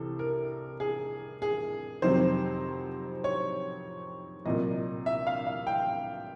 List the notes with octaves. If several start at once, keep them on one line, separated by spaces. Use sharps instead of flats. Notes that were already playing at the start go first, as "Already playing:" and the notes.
Already playing: C2 C3 E3 A4
A#4
G#4
G#4
F2 C3 D#3 F#3 C5
C#5
C2 A#2 F#3 D#5
E5
F5
F5
G5